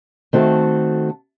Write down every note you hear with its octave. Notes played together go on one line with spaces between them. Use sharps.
D#3 A3 C4 F#4 A4